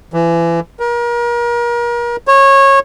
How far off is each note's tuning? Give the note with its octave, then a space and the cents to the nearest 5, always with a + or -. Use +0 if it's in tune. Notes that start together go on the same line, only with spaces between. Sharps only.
E3 +30
A#4 +35
C#5 -20